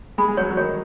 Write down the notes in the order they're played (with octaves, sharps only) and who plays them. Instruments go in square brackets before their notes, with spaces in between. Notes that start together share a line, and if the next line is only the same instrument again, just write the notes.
[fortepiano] G#3 [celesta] B5
[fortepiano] G#3
[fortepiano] F#3 [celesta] C#5
[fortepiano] F#3
[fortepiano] D#3 [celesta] C#5